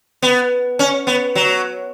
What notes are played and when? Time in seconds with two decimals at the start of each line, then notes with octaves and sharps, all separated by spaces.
0.22 B3
0.79 C#4
1.07 B3
1.35 F#3